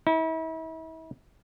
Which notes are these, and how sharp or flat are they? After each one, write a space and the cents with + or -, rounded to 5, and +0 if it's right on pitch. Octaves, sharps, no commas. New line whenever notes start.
E4 -40